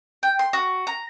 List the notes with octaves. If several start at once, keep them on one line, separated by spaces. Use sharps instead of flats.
G5
C6
F#4
A#5